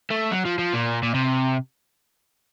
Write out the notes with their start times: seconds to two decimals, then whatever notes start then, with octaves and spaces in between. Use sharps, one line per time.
0.11 A3
0.32 F#3
0.46 F3
0.59 F3
0.73 A#2
1.03 A#2
1.14 C3